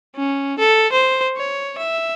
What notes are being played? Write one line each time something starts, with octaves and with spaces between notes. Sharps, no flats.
C#4
A4
C5
C#5
E5